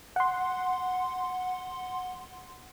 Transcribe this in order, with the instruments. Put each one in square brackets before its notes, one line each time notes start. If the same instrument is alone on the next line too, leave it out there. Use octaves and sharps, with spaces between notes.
[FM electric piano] F#5 C6